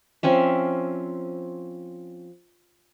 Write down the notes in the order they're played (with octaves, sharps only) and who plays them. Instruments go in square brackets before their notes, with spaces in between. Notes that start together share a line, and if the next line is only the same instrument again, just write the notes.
[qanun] F3 C4 C#4 E5